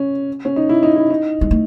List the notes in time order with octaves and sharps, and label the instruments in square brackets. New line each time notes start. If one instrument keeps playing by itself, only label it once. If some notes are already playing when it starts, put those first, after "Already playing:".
Already playing: [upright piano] C#4
C#4
D#4
E4
D#4
E4
D#4
[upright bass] G#3
A3